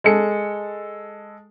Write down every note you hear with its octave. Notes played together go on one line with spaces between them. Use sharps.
G#3 A4 C#7